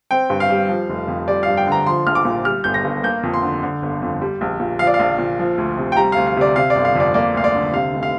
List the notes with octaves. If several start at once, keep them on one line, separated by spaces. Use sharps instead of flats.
C4 G5
G2
F5
G3
F3
F1
F2
G3 D5
F5
G2
G5
D3 A#5
F3 C6
A#1 F6
D6
A#2
G3 F6
G1 G6
A#6
G2
A#3 G6
F2
C6
D3
D3
G1
F2
G3
A#1
A#2
F3 F5
D5
F5
A#1
A#2
F3
D2
C3
G5
G3 A#5
D2 F5
F5
C3 D5
C3 F5
D5
G1
F5
F2 D5
A#3 D5
D2 F5
D5
D3
C3 F5
F1
F5